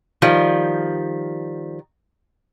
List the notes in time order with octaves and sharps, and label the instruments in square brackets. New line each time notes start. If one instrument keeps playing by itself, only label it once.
[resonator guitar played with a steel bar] D#3 F3 G3